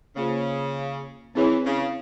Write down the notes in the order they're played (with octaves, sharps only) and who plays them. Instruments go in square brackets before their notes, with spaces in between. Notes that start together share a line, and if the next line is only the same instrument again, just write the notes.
[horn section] C#3 [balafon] A#3 F4 C5
[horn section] E3 [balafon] C4 E4 G#4 C#5
[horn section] C#3